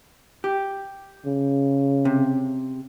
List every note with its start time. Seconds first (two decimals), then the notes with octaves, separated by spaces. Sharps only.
0.44 G4
1.26 C#3
2.05 C3